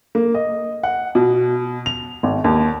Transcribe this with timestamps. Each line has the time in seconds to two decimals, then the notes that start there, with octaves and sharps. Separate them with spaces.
0.15 A#3
0.34 D#5
0.83 F#5
1.15 B2
1.86 F7
2.23 G#1
2.44 D#2